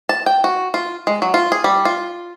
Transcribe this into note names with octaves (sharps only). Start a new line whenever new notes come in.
A5
G5
F#4
F4
G#3
F#3
F4
G#4
G3
F4